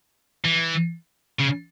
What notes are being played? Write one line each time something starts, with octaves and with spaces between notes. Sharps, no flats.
E3
C#3